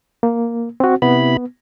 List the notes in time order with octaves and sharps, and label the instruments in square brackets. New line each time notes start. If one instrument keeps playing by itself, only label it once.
[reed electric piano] A#3
C4 F#4
[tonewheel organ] C3 E4 B5 [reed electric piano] B3